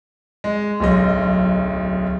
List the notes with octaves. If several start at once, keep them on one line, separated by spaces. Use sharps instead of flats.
G#3
D1 B1 D#5